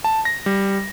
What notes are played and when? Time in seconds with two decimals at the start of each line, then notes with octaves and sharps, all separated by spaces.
0.04 A5
0.25 A#6
0.46 G3